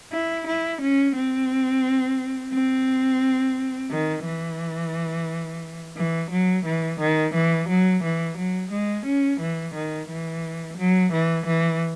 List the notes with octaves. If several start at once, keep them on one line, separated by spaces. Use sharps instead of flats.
E4
E4
C#4
C4
C4
D#3
E3
E3
F#3
E3
D#3
E3
F#3
E3
F#3
G#3
C#4
E3
D#3
E3
F#3
E3
E3